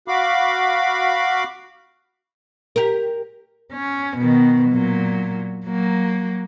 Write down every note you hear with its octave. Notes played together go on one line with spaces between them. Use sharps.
F#4 F5 B5 D6
G4 A#4
C#4
B2 D#3
A#2 F#3
F#3 A#3